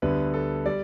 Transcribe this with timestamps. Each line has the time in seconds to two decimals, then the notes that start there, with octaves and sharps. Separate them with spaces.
0.02 D2 D3 G3 B3 B4
0.34 A4
0.65 G3 D5